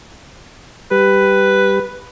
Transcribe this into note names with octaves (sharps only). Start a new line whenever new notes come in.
G3 G4 B4